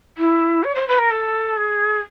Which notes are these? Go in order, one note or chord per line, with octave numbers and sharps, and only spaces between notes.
E4
C#5
C5
B4
A#4
A4
G#4